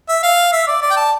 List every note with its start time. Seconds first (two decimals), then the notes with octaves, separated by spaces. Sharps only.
0.09 E5
0.23 F5
0.52 E5
0.68 D5
0.82 D5
0.91 G5
0.96 A5